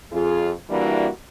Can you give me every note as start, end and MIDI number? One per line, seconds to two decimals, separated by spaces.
0.12 0.52 41
0.12 0.52 65
0.12 0.52 68
0.70 1.09 52
0.70 1.09 55
0.70 1.09 58
0.70 1.09 62
0.70 1.09 64
0.70 1.09 66